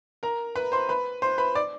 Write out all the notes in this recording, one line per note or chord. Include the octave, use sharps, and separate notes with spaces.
A#4 A#5
B4 B5
C5 C6
B4 B5
C5 C6
B4 B5
D5 D6